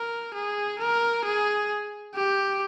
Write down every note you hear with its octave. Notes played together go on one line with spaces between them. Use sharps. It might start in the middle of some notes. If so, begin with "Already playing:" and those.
Already playing: A#4
G#4
A#4
G#4
G4